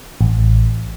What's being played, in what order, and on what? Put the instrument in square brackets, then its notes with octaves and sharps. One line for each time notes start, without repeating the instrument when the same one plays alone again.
[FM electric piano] A1